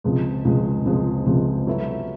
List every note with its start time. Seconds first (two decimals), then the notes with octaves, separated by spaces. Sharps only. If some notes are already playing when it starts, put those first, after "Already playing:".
0.04 C#2 C3 F3 G#3
0.45 C#2 C3 F3 G#3
0.85 C#2 C3 F3 G#3
1.26 C#2 C3 F3 G#3
1.67 F#3 B3 E4 A4